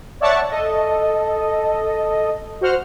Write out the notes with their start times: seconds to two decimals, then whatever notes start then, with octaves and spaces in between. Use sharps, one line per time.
0.20 C#5 D5 E5 F#5 A5 C#6
0.50 A4 D#5
2.61 F#4 C5 F#5 F6